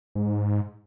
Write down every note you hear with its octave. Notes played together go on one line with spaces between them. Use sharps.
G#2